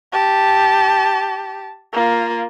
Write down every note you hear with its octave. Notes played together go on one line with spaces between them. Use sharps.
G4 A5
A#3 F4